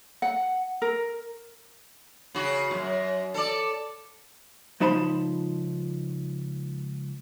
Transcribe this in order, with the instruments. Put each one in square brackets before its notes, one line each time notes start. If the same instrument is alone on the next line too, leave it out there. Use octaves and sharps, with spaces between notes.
[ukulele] F#5
A#4
[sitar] C#3 F#4
F#2 A#2
A4 D5
[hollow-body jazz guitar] C#2 F3 D#4 A5 B5 C6